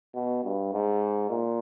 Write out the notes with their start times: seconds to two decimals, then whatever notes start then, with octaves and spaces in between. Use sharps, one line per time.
0.15 B2
0.44 G2
0.73 G#2
1.30 A#2